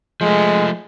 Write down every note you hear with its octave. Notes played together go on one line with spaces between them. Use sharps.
F3 G#3 A3